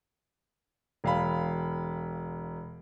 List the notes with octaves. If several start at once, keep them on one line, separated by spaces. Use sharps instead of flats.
E1 F5 B5